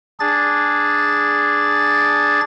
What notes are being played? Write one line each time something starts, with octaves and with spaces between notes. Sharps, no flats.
D4 G#4 A6